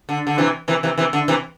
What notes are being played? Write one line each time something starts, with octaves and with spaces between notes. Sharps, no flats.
D3
D3
C3 E3
C3 E3
C3 E3
C3 E3
D3
C3 E3